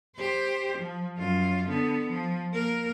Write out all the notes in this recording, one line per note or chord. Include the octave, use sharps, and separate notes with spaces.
G4 C5
F3
F#2 F4
D3 B3
F3
A#3 A#4